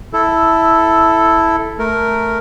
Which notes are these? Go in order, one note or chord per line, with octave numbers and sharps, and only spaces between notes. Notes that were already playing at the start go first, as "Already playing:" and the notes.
E4 A4
A3 A#4